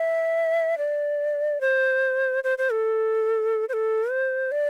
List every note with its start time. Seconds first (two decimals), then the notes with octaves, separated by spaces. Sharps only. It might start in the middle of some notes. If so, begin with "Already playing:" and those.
Already playing: E5
0.78 D5
1.61 C5
2.44 C5
2.58 C5
2.72 A4
3.69 C5
3.73 A4
4.11 C5
4.52 D5